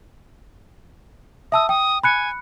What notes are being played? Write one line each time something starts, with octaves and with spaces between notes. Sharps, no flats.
E5 A5 D#6 E6
G5 D#6
G#5 B5 F#6 C#7